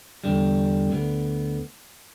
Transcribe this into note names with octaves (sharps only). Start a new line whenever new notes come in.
E2 D3 G3
D2 D3 B3